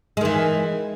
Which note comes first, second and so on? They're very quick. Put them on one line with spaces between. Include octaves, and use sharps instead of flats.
G#3 D#3 E3